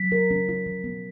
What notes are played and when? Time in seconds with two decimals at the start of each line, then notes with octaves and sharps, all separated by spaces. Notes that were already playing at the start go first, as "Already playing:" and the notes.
Already playing: F#3 B6
0.12 A#4
0.31 C#4
0.49 F4
0.66 F3
0.84 B3